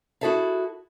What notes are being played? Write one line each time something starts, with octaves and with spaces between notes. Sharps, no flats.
E4 F#4 G#4 A4 E5 F5